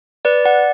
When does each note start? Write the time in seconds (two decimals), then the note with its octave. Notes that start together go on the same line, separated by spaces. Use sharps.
0.25 B4 D5
0.45 D5 F#5